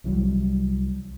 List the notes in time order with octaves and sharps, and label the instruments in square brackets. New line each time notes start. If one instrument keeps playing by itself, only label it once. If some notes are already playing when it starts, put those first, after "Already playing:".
[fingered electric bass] C2 E3 F#3 G3